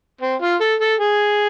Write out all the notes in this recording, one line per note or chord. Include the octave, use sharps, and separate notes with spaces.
C4
F4
A4
A4
G#4